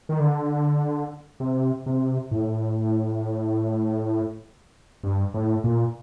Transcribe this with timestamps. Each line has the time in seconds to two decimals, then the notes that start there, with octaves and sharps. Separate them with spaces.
0.09 D#3
0.19 D3
1.40 C3
1.86 C3
2.31 A2
5.04 G2
5.34 A2
5.64 A#2